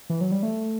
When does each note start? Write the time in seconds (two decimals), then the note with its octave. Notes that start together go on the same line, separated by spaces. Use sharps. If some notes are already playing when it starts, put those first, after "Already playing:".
0.10 E3
0.21 F#3
0.32 G3
0.43 A3